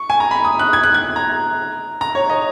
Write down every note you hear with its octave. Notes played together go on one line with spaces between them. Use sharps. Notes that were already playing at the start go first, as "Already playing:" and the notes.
Already playing: C#6
G#5
A#5
B5
D#6
F#6
G#6
F#6
G#6
A#5
A#5
C#5
D#5